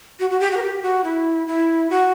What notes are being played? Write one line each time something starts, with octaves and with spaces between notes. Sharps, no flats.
F#4
F#4
G4
F#4
A#4
G4
F#4
E4
E4
F#4